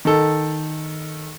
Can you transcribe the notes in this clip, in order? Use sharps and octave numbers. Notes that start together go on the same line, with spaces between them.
D#3 A4